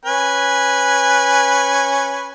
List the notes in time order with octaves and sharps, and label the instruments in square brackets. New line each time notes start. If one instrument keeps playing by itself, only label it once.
[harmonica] C#4 B4 G#5